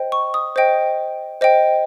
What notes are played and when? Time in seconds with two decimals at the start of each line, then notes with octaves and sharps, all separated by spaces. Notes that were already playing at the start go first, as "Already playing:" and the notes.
Already playing: C5 D#5 G5
0.12 C#6
0.34 D#6
0.56 C5 D#5 G5
1.41 C5 D#5 G5